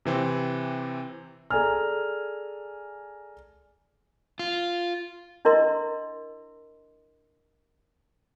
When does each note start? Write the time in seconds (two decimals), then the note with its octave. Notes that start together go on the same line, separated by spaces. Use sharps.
0.05 C3 E3 C4
1.50 G#4 A4 D5 G#5 A#5 F6
4.39 F4
5.45 D4 E4 A#4 D#5 C6